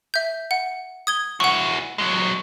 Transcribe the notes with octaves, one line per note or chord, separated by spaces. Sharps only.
E5 G6
F#5
D#6 G#6 G7
E4 F#4 F#5 C#6
F#3 G#3